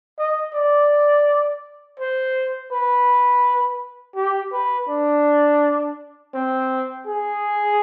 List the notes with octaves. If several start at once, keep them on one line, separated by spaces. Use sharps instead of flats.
D#5
D5
C5
B4
G4
B4
D4
C4
G#4